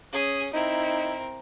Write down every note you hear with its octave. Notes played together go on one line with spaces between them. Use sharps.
C#4 G#4 D#6
C4 D#4 E4 A#4